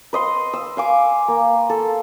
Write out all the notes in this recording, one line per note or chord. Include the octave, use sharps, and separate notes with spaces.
B4 D#5 C6
E6
F5 G#5 D6
A#3
A4